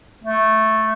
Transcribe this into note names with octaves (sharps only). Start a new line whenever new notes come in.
A3